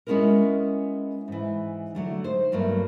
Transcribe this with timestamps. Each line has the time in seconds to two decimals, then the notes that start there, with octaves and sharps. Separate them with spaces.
0.07 G#3 B3 C#4 E4 G#4 A#4
1.28 G#2 E3
1.95 D3 F#3 A3
2.24 D#4 C5
2.52 G2 F#3 A3 A#3